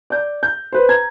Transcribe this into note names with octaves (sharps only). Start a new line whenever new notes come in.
D5 G6
G6
B4 C5
A#5 G#6